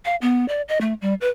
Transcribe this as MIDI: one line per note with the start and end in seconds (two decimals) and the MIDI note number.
0.05 0.16 77
0.21 0.47 59
0.48 0.61 74
0.68 0.78 75
0.81 0.94 57
1.01 1.14 55
1.21 1.28 71